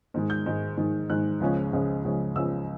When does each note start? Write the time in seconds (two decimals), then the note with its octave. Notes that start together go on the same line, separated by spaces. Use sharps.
0.14 G#2 D#3 G#3
0.30 G6
0.46 G#2 D#3 G#3
0.77 G#2 D#3 G#3
1.09 G#2 D#3 G#3 F#6
1.41 C#2 C#3 F3 G#3 C#4
1.73 C#2 C#3 F3 G#3 C#4
2.04 C#2 C#3 F3 G#3 C#4
2.36 C#2 C#3 F3 G#3 C#4 E6